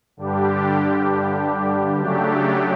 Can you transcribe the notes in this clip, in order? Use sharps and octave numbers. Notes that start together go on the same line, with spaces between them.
G2 D3 G3 D4 G4
C#3 F#3 A3 D4 G4